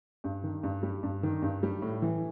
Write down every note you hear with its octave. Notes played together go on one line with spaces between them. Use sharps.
G2
D#3
G2
G3
G2
D#3
G2
G3
A2
E3